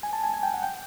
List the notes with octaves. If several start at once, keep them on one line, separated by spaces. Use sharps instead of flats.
G#5
A5
G#5
G#5
G5
F#5
G5